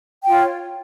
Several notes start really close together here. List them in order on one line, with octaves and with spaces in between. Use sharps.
G5 F4 C#5